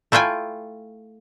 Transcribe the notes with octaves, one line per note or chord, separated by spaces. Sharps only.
A3 E4 F4 G5 G#5